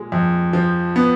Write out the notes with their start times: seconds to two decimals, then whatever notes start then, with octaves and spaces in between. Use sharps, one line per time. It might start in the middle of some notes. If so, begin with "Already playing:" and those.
Already playing: A#2 G#3
0.12 F2
0.53 F3
0.96 B3